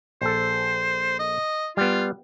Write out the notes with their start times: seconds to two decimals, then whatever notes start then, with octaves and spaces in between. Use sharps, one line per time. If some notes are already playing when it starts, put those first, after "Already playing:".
0.21 A#1 A4 C5
1.19 D#5
1.77 G3 B3 F4